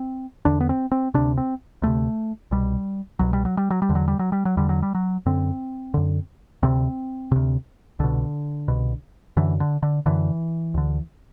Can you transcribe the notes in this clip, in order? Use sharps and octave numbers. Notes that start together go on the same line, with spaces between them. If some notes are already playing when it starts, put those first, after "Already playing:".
Already playing: C4
E2 D3 D4
B3
C4
C4
D2 C3 D4
C4
D2 C3 A3
C2 B2 G3
C2 B2 F#3
G3
F#3
G3
F#3
G3
E2 D3
F#3
G3
F#3
G3
F#3
E2 D3 G3
F#3
G3
F#3
F#2 D3 C4
F#2 D3
D2 C3 C4
D2 C3
C2 B2 D3
C2 B2
F#2 D3 E3
D3
D3
F#2 D3 E3
D2 D3